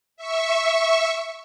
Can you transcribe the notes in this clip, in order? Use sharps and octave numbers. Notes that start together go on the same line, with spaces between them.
E5 C#6